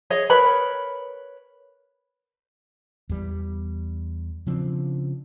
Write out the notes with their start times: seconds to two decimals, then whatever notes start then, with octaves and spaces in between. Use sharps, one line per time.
0.10 G#4 C#5 D#5
0.30 A#4 B4 C#5 B5
3.09 E2 G3
4.47 C#3 F3 C4 D4